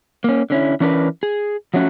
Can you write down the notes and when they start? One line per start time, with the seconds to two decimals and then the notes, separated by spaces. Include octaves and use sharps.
0.24 A#3 C#4
0.50 D3 C#4 E4
0.80 E3 C#4 D4 A#4 B4
1.23 G#4
1.74 F3 F#3 A3 C#4 F#4